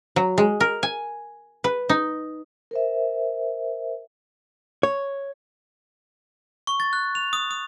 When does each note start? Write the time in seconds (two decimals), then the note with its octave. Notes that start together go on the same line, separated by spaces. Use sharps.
0.16 F#3
0.38 G#3
0.60 A#4
0.83 G#5
1.64 B4
1.89 D#4
2.71 A#4 C5 E5
4.83 C#5
6.67 C#6
6.80 A6
6.93 F#6
7.15 F7
7.33 D#6
7.51 D#6